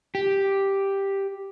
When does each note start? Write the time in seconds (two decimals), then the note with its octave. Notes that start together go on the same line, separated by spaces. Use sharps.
0.15 G4